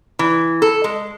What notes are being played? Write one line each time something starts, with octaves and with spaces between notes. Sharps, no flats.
E3
A4
G#3